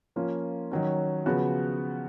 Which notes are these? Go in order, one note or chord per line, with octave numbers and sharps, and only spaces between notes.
F3 A#3 C#4 F4
D#3 F#3 C#4
C#3 F3 B3 F#4